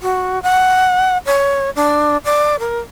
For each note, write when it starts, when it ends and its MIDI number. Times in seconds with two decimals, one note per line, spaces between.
0.02 0.42 66
0.43 1.18 78
1.26 1.70 73
1.76 2.17 62
2.25 2.56 74
2.59 2.79 70